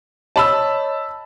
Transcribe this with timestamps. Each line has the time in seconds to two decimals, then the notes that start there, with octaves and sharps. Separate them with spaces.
0.36 C#5 D#5 A5 B5 E6